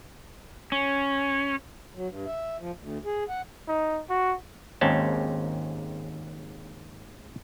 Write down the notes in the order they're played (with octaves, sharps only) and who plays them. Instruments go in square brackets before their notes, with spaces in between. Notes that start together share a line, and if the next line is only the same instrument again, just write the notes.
[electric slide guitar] C#4
[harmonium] F#3
G2
E5
F3
D2
G#4
F#5
[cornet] D#4
F#4
[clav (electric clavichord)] G#1 D#2 G#2 C4 C#4 A5